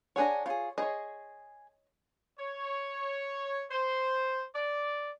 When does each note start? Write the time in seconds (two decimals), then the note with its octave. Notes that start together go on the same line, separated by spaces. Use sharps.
0.16 D4 G#4 C#5 F#5 G#5 A#5
0.46 F4 G#4 C#5
0.78 G#4 C#5 D#5 C6
2.39 C#5
3.71 C5
4.55 D5